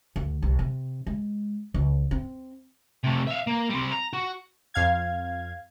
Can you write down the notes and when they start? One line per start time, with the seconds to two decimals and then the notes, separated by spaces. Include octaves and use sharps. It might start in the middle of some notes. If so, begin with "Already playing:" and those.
0.16 D2
0.42 C2
0.59 C3
1.07 G#3
1.74 C#2
2.11 C4
3.04 C3 A3
3.27 E5 F5
3.47 A#3
3.69 G3 C4
3.92 A#5
4.13 F#4
4.74 F2 F5 G#6